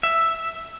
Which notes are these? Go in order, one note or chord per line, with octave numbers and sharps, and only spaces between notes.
E5